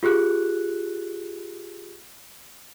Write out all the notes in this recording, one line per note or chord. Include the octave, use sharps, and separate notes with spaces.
F4 G4 G#4 F#6